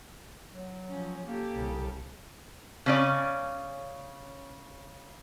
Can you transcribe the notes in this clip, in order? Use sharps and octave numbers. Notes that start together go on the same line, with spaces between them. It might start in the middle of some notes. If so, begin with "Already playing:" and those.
F#3
F3 C#4
A#3 G4 A4
C2 C#3
C#3 C#4 D5